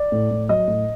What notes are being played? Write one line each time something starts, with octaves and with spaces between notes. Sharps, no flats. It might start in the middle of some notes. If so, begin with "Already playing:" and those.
Already playing: D5
A2
A2
F#3 D#5
A2